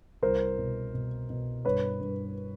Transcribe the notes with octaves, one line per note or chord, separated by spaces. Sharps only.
C2 A#4 C5
B2
B2
B2
G2 B4 C#5
G2